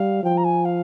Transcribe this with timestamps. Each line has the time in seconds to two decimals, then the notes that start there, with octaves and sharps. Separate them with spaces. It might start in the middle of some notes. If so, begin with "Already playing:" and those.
Already playing: G3 F5
0.23 F3 G5
0.37 A#5
0.44 G#5
0.65 F5